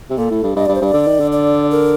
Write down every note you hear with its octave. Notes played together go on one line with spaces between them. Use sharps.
C3
A#2 A4
A2
G2
G2 D#5
G2 D5
C5
G2 D5
D3
D#3
D3
D5
A#4